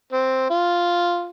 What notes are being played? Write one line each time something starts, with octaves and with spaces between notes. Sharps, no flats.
C4
F4